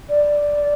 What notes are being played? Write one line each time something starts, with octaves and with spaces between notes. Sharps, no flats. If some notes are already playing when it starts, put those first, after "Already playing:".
D5